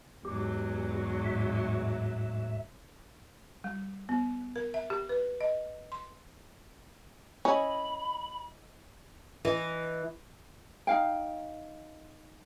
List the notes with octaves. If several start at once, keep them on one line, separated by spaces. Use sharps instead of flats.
E2 G#2 F#3 G4
A2 E5
G3
B3
A#4
E5
G4
B4
D#5
C6
C#4 E4 D#5 B5
E3 D#5
D#4 F5 G5